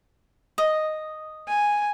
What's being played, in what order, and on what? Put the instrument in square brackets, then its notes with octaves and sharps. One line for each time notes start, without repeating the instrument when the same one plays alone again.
[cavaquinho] D#5
[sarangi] G#5